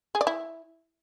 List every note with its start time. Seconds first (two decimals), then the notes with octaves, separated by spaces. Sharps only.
0.15 G#4
0.21 D5
0.27 E4